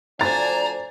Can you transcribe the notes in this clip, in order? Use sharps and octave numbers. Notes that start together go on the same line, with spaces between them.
D2 F3 D4 C5 G#5 A#5 A6